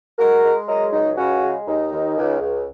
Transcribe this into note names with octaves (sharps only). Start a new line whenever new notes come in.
G#3 F#4 A#4
G#3
F#3 A#4 D#5
C#2 D#4
C#3 C#4 F#4
G#3
D#2 D#4
D#2
C#2
C#2